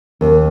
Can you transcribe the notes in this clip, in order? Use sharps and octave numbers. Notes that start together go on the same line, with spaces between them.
D#2